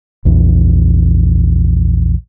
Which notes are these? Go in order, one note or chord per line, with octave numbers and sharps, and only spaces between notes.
A#1 E2